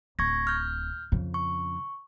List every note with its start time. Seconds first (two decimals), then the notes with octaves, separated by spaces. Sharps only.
0.19 D1 C#6 G#6 A#6
0.47 F6 G6
1.12 F2 C#3
1.34 C#6